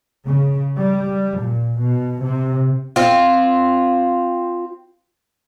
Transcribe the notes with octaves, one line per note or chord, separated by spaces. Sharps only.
C#3
G3
A#2
B2
C3
C4 F4